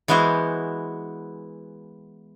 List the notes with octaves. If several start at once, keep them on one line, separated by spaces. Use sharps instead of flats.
E3 G#3 B3 E4 F#4 C5